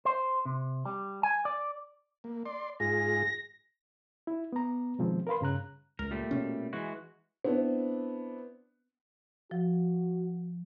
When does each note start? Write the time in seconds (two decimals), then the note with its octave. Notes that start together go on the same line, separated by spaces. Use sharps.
0.05 C5
0.45 C3
0.85 G3
1.23 G#5
1.45 D5
2.24 A#3
2.46 D5 C6
2.80 G#2 F4 G#4 A#6
4.27 E4
4.52 B3 A#5
4.99 B2 D#3 F3 G#3 C4
5.27 A#4 B4 F5 B5 C6
5.41 G2 C#3 A#5 F#6
5.99 C#2 A#4
6.11 A#2 G3 A3
6.31 B2 C#4
6.73 E3 G#3 F#4
7.44 B3 C4 D4 E4
9.51 F3 F#4